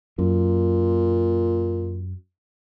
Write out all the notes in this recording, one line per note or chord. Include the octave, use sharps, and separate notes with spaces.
F#2 A#2